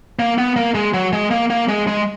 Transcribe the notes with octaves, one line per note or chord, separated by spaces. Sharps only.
A#3
B3
A#3
G#3
F#3
G#3
A#3
A#3
G#3
G#3